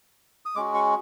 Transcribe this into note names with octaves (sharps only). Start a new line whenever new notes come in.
D#6
G#3 C#4 F#4 D6
C#6